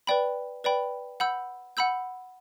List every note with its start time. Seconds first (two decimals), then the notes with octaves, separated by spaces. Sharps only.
0.07 B4 D5 G5 B5
0.64 B4 D5 G5 B5
1.20 F#5 B5 E6 G6
1.77 F#5 B5 E6 G6